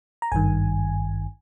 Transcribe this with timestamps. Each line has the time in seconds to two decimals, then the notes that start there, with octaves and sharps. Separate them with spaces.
0.22 A#5
0.32 G#1 G2 D#3 G#5